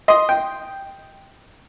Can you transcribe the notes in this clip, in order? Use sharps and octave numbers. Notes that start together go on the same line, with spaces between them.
D#5 C6 D#6
G5